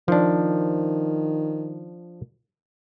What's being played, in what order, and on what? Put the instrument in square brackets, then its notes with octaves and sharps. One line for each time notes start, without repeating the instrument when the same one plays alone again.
[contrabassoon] D#3 [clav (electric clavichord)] F3 D4